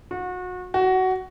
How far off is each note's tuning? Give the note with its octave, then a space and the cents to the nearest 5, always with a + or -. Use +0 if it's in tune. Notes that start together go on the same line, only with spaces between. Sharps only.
F#4 -30
F#4 +15